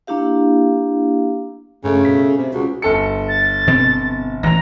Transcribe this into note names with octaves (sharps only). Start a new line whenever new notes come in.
A#3 D4 E4 G4 F5
G2 C#3 A3
B2 B6
C3
C#2 F#4
G1 A4 C#7
A6
B2 C4
A1 E3 A#5 A#6